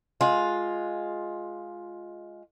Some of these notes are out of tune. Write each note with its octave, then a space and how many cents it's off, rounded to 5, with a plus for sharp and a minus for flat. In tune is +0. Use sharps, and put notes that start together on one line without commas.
G#3 +10 F4 +10